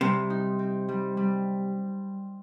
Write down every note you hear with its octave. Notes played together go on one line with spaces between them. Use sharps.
C3 G3
D#4
C4
G3
G3